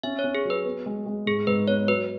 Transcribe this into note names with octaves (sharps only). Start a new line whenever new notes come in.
C#4 E5
C#5
C#4
G#4
F#3
B4
B3
G#3
G#3
G#2 G#4
G#2 B4
B3 C#5
F#3 B4